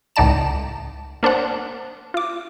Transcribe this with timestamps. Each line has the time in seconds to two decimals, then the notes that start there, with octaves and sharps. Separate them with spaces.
0.16 C#2 A2 D#4 D5 A5 E7
1.23 A#3 D4 C5 F#5
2.14 F4 D6